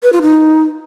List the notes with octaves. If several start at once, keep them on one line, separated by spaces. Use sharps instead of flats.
B4
F4
D#4